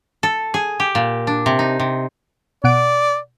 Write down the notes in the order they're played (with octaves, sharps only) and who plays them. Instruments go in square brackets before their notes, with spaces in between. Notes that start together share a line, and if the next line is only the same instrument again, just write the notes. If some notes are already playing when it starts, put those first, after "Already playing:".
[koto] A4
G#4
G4
A#2
D4
C3
D#4
C3
[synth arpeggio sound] B2 F#5 D7 [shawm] D5